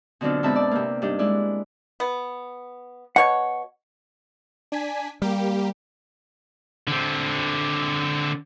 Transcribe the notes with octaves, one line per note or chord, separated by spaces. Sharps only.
B2 D3 F#3 C4 D4 F4
G#2 B2 C4 E5 A5 B5
D5
C3 A#3
G2 G3 D4 D#4
G#3 E4 D5
B3
B2 C#5 F#5
D4 G#5 B6
G3 A#3 G4
D3 C4